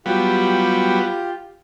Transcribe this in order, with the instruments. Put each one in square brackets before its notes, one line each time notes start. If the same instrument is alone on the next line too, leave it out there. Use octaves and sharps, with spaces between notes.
[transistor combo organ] F#3 G3 B3 [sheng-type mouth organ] F4 G4